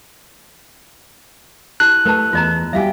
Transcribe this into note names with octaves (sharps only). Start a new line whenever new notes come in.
E4 G4 A5 F#6
A3 A#4 B4 A5
E2 F4 D#5 A#5
G3 F#4 G4 E5 F5 G#5